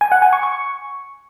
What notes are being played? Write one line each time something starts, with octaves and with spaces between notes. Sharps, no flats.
G#5
F#5
G#5
C#6
C#6